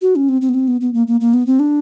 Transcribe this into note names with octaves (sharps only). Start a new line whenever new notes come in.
F#4
C#4
C4
C4
B3
C4
B3
B3
A#3
A#3
A#3
B3
C4
D4